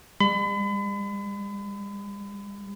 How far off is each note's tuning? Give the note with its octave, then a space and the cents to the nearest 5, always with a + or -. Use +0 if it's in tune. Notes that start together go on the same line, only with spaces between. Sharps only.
G3 +45 B5 +40